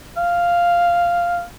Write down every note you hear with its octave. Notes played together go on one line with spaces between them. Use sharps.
F5